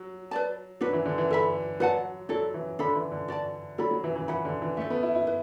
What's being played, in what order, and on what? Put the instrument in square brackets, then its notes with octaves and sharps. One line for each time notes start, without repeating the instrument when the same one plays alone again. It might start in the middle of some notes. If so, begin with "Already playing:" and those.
Already playing: [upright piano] F#3
[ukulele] B4 D5 A5
[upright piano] F#3 [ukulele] D4 F#4 B4
[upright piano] E3
D3
E3
[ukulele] A4 E5 B5
[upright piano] F#3 [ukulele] B4 D5 F#5 A5
[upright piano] F#3 [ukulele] E4 A4 D5
[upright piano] E3
[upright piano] D3 [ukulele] D4 A4 E5 B5
[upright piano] E3
D3
[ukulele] F#4 D5 A5
[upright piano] F#3 [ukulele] A4 D5 B5
[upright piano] F#3
E3
E3
[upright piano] E3 [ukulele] B4 F#5 B5
[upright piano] D3
E3
[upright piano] A3 [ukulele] E4 A4 E5
[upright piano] B3
E4
E4
[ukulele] B4